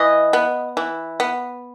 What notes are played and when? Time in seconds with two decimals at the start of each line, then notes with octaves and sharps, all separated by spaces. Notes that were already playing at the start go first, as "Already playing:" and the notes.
Already playing: E3 D#5
0.33 B3
0.77 E3
1.20 B3